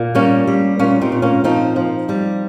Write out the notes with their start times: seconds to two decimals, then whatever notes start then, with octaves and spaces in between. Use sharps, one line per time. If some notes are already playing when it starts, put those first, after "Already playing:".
Already playing: A#2
0.15 G3 A#3 C#4
0.47 G3
0.80 A#2 C#4 F4
1.01 C4 D#4
1.12 A#2
1.22 A#3 C#4
1.44 F3 C4 D#4
1.76 F3
2.09 G3